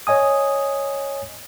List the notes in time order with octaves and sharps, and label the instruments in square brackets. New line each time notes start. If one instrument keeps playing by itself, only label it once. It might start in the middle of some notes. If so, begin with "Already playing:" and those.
[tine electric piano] C#5 D#5 G#5 D#6